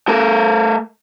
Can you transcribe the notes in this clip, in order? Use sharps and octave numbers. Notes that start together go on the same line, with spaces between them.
A3 A#4